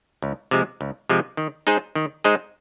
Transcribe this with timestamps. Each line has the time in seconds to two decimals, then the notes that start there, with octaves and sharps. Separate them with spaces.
0.22 C#2
0.51 C3 F3 G#3
0.81 C#2
1.09 C3 F3 G#3
1.37 D#3
1.67 G#3 D#4 G#4 C5
1.95 D#3
2.24 G#3 D#4 G#4 C5